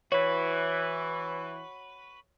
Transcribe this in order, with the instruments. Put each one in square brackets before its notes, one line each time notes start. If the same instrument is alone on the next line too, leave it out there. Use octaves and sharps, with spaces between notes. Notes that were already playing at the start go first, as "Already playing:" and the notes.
[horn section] E3 [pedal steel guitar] F#4 B4 [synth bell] C#5